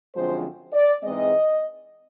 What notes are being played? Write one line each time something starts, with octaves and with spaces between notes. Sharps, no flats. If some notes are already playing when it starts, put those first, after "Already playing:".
F#2 D3 F3 G#3 C4 C5
D5
G#2 E3 G#3 C4 D#5